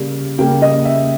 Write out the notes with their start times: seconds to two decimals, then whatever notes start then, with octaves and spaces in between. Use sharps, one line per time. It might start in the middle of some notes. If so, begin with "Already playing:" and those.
Already playing: C#3 G3 A#3
0.38 C#3 G3 A#3 G5
0.62 D#5
0.85 E5